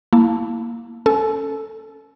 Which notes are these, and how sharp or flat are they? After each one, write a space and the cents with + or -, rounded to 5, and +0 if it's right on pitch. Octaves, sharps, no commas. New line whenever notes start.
A#3 +0 E4 -5 A5 +0
C#4 +0 A4 +0 A5 -45